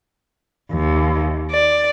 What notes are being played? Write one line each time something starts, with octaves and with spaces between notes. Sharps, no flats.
D#2
D5